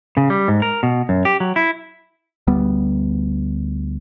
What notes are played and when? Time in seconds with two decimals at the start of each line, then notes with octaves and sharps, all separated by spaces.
0.17 C#3
0.30 G3
0.48 G#2
0.62 A#4
0.83 B2
1.09 F#2
1.25 G4
1.40 F#3
1.56 E4
2.47 D2 G3 B3